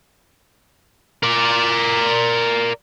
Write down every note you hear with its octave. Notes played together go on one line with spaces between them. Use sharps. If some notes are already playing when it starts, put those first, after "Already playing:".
A#4 D5